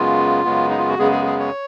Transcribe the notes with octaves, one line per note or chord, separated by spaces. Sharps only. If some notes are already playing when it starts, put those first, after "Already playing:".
Already playing: F#2 C#3 G#3 B3 F4
F#2 C#3 G#3 B3
D#4
F4
F#4
F#2 C#3 G#3 B3 G#4
G#4
G#4
C#5